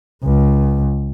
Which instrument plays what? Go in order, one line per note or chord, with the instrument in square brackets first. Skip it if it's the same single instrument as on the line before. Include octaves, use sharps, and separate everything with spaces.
[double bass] C#2